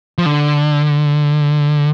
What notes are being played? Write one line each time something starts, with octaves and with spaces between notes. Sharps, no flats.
F3
D3